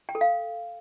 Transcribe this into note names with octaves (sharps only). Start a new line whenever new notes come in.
G5
A4
F5